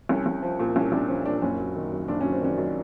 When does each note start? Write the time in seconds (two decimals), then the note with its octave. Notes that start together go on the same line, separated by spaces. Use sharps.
0.09 C2 C#4
0.26 C2
0.43 F3
0.59 A#2
0.76 C2 C#4
0.92 C2 D4
1.08 F3 C#4
1.25 A#2 D4
1.42 F#1 C#4
1.59 F#3
1.76 D#3
1.92 F#2
2.08 F#1 D4
2.21 F#3 C#4
2.32 C4
2.42 D#3 C#4
2.58 F#2